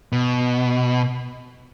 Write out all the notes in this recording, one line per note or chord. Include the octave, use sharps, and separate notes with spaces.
B2